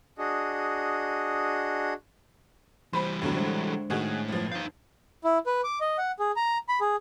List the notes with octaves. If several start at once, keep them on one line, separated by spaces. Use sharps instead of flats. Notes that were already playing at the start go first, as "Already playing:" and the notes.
D4 F#4 G#4 D#5
E3 G3 C5 B5
E2 A2 D3 F#3 B3
G#3 D4 C5
A2 D#3 F#4 G#4
G1 F3
D#4 F5 G6
E4
B4
D6
D#5
F#5
G#4
A#5
B5
G#4